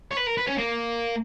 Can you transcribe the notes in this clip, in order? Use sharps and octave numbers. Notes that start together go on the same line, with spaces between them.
C#5
B4
A#4
B4
C#4
A#3